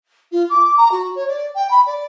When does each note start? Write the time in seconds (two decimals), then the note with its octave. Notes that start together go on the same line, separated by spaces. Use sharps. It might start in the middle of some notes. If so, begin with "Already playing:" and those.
0.32 F4
0.50 D6
0.78 A#5
0.92 F#4
1.15 C#5
1.28 D5
1.55 G5
1.71 B5
1.87 D5